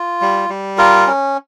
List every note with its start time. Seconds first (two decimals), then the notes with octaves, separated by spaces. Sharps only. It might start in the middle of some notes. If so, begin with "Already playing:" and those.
Already playing: F4
0.21 G3
0.49 G3
0.78 F4 A#4
1.07 C#4